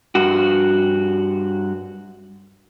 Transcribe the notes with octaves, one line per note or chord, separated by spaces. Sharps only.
G2 F#4